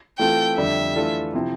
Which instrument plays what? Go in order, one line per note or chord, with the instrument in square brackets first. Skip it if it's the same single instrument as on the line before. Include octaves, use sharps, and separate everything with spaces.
[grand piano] E3 A3 C4 F4 A4 [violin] G5
[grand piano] F2 D3 G3 D4 [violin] E5
[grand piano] E3 A3 D4 F4 A4
C3 F3 C4 E4